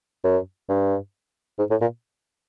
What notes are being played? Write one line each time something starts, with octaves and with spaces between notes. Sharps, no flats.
F#2
G2
G#2
A2
A#2